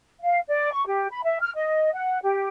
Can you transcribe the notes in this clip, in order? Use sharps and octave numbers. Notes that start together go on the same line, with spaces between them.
F5
D5
C#6
G4
B5
E5
F6
D#5
F#5
G4